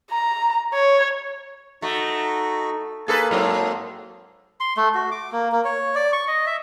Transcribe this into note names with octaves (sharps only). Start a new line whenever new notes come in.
A#5
C#5
A3 D#4 F#4
A#3 G#4 A4 B4
G#2 F#3 C4
C6
A3
F#4
D6
A#3
A#3
C#5
D5
C#6
D#5
E5